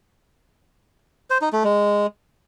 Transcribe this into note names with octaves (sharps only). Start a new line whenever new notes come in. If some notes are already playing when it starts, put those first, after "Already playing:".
C5
D#4
A3
G#3